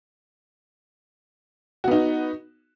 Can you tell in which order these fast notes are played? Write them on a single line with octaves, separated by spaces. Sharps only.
F#4 B3 D#4